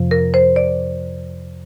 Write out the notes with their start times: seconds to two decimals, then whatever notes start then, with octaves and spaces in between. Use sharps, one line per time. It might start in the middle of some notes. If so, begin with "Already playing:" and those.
Already playing: F2 C3 F3
0.11 A#4
0.34 C5
0.56 D5